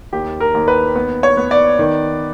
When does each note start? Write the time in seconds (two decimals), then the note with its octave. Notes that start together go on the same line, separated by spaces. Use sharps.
0.13 D#2 G4
0.40 A#4
0.54 D#2
0.68 B4
0.96 B3
1.23 C#5
1.37 B3
1.51 D5
1.79 D#3